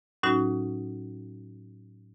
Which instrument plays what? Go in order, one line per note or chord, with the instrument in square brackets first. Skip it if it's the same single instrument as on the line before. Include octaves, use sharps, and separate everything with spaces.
[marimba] A2 F#3 C#4 D#4 F#4